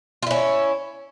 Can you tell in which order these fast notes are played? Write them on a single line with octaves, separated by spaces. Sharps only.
F4 E4 C#4